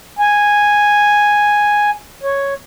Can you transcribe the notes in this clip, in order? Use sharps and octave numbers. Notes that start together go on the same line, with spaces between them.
G#5
C#5